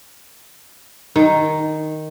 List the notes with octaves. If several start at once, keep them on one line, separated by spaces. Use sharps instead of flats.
D#3